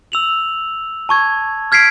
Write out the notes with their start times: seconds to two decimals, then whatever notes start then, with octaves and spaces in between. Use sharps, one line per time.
0.12 E6 F7 F#7
1.09 A5 C#6 G#6
1.72 F6 G#6 B6 C7 D7